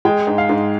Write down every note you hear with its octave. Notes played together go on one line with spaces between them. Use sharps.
G#3 G5
G#2
F5
G#2